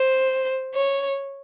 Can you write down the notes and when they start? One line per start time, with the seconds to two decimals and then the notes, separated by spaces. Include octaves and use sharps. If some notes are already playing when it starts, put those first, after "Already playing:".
Already playing: C5
0.74 C#5